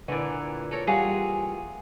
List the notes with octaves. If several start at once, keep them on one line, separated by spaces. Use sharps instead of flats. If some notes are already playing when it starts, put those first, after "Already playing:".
A#2 D3 E3
A4 A#4 C#5
G3 F4 F#4 G#4